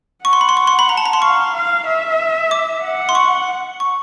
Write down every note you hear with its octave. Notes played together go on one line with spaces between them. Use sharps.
F#5 C#6
C6
B5
C6
C#6
C6
B5
A#5
A5
A#5
C6
F5 C#6
F5
E5
D6
F#5
C6
C#6
C#6